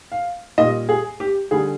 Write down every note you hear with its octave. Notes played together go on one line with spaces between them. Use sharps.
F5
A#2 G3 D#5
G#4
G4
D3 G3 G#4